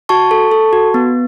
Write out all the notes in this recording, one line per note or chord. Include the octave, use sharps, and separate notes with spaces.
F#4 A5 C#6
A4
A4
F#4
B3